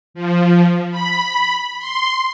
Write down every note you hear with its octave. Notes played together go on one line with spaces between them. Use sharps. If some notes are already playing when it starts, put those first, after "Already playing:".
F3
B5
C6